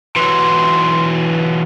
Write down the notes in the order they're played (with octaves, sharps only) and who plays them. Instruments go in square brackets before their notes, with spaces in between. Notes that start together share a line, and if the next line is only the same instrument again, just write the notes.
[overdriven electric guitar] E3 F#3 [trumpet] C6